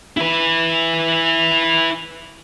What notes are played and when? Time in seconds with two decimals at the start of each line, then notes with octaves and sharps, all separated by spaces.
0.17 E4 B4